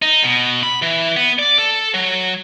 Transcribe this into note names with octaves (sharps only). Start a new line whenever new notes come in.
D#4
B2
B5
E3
B3
D5
A4
F#3